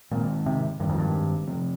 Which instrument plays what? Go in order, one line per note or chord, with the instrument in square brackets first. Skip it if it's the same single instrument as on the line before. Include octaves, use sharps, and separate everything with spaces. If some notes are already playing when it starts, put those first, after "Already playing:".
[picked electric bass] A#2 [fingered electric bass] D#3 G#3 C4
[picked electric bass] C3
[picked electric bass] G2 [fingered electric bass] D#3 G#3 C4
[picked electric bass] F2
G2
[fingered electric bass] C3 F3 C4